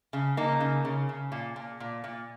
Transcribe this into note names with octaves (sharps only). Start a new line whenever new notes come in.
C#3
C#3 A#3 D#4
C#3
C#3
C#3
A#2
A#2
A#2
A#2